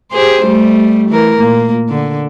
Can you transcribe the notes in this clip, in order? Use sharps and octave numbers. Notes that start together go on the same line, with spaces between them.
G4 G#4 C5
G3 A3
E3 A#4
A#2 A#3
D3